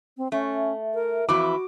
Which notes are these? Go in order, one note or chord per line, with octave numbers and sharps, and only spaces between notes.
C4
A3 C#4 E5
A#4
F2 E3 E4 F#4 D6